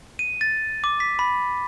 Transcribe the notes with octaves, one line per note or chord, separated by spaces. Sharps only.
D#7
A6
D6
B6
B5